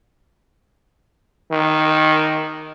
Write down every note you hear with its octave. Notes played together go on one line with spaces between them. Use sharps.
D#3